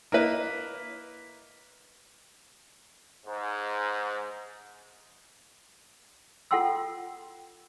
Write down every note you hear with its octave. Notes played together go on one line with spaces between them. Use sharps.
A#3 E4 B4 D#5
G#2
F4 A4 F#5 G5 C6 E6